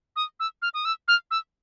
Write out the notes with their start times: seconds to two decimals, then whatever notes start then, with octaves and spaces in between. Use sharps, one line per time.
0.16 D#6
0.40 E6
0.62 F6
0.74 D#6
0.85 E6
1.08 F6
1.31 E6